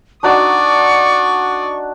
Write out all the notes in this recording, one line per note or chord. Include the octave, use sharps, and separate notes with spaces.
D4 D#4 F#4 D5 C#6 D#6